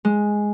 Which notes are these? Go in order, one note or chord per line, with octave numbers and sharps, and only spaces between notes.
G#3